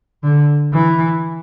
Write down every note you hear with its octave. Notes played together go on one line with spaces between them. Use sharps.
D3
E3